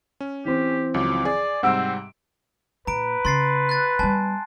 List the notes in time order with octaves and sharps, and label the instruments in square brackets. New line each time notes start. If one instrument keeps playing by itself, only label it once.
[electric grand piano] C#4
[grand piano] E3 C4 [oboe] G4
[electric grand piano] C#2 F3 F#3 [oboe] D6
[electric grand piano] G#4 [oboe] D5
[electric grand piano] G#2 C3 G3 [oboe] C4 [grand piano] F#5 E6 D7
[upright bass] A#2 [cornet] B4 [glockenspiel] A#5 D7
[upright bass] C#3 [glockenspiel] C6 A6 C7
[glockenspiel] F#6 A6
[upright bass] G3 B3 [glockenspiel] G#5 A5